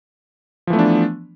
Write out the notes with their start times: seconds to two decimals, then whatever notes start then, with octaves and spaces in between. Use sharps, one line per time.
0.67 F3
0.70 E3
0.73 A3
0.76 B3
0.79 D4